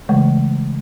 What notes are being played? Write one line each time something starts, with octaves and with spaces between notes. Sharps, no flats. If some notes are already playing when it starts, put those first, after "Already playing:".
C#3 E3 G#3 A3